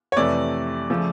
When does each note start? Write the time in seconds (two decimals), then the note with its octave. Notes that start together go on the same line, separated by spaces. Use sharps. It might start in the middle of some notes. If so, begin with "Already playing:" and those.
0.12 C#5
0.17 F2 C3 E3 A3 D5
0.90 C#3 F3 A3